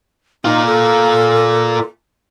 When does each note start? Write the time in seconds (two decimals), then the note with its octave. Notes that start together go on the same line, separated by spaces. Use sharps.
0.45 A#3 D#4 F4
0.66 A4